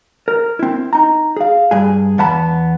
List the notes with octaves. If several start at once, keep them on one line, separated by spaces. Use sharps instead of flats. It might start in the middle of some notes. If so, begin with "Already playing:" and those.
A#4
C4 E4
D#4 A#5
G#4 F5
G2 G#4
E2 B3 F#5 A5 B5